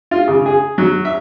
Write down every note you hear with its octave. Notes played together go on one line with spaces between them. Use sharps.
F4
C#3
G#4
F#3
E5